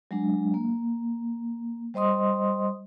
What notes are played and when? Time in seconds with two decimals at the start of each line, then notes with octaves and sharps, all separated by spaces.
0.11 F#3 G#3 D4
0.54 A#3
1.94 G3 C5 D#5 C6 D#6